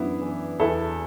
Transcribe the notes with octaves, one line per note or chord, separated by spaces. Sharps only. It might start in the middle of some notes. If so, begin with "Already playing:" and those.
Already playing: F#2 E3 B3 D4 E4
E3
E2 E4 A4